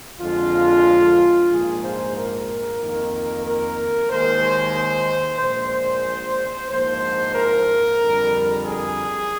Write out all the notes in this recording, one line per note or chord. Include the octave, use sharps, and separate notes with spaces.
F2 D3 F3 G#3 F4
A#1 G#2 F3 A#3 G#4
C5
A#4
F2 D#3 A#3
A#4
D#2 D#3 G#3 C5
A#1 A#2 G#3 C5
A#1 G#2 F3 A#3 C5
A#4
F2 D3 G3
G#4